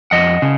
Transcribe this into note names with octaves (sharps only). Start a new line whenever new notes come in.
F2 D#5 F#5
C#3